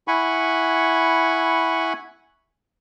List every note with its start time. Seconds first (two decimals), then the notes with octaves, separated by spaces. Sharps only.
0.08 E4 F#5 G#5 B5 C#6